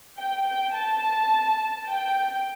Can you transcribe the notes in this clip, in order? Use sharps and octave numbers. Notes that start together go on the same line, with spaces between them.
G5
G5
A5
G5